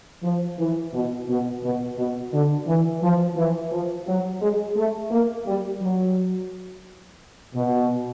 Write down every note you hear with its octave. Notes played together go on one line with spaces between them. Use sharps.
F3
E3
B2
B2
B2
B2
D3
E3
F3
E3
F3
F#3
G#3
A3
A#3
G3
F#3
B2